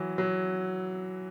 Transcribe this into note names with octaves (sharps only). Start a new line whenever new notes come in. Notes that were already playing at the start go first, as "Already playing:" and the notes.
Already playing: E3 F#3
F#3